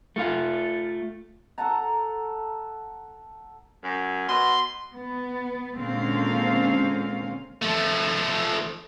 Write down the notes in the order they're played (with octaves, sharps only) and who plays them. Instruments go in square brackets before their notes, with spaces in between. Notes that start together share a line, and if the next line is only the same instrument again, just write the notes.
[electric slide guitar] A3 F4 F5
[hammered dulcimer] A4 F#5 A5 A#5
[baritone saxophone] F#2
[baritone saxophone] B2 [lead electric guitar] C6
[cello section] B3
A#2 D3 G#3 C4 C#4 F5
[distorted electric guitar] F3 A3